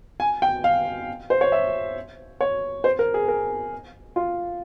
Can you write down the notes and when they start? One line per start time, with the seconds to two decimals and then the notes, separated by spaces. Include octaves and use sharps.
0.20 G#5
0.42 G5
0.64 F5
1.30 C5
1.41 C#5
1.52 E5
2.41 C#5
2.84 C5
2.99 A#4
3.14 G#4
3.28 A#4
4.16 F4